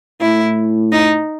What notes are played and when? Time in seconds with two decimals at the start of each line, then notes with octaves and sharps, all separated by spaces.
0.20 A2 E4
0.92 D#4